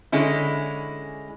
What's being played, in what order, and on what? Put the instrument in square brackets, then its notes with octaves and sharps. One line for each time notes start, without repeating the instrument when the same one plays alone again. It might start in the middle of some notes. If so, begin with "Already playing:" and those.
[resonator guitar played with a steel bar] D3 G#3 C#4 E4